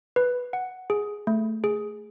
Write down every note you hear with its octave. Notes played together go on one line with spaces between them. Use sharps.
B4
F#5
G#4
A3
G#4